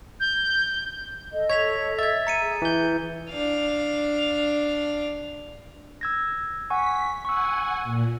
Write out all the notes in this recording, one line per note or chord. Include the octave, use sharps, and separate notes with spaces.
G6
A4 D#5
C#5 G#6 B6 F7
E5 G#6 A6
A#5 C#7 D#7
G#4
E3 G6
D4 F5
E6 G#6 A#6
F#5 G#5 C#6 B6
F#5 G#5 C#6 E6
A#2